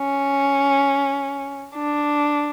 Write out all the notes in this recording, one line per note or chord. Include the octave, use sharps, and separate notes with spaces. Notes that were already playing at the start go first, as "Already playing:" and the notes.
Already playing: C#4
D4